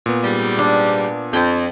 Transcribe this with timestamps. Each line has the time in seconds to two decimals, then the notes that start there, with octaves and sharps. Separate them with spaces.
0.06 A#2 B3
0.24 G#2 G3
0.59 D4
1.33 F2 G5